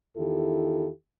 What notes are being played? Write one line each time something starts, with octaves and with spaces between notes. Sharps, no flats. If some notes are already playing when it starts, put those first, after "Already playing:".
E2 D#3 E4 F4 G4 A4